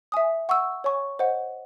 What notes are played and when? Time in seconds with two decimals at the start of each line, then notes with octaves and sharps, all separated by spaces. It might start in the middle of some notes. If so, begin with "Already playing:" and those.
0.12 E5 G#5 D#6
0.49 F#5 C#6 E6
0.84 C#5 G#5 C#6
1.19 C5 D#5 F#5